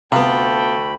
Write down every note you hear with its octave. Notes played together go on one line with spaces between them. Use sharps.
D2 C3 B3 F4 F#4 A4 G5 B5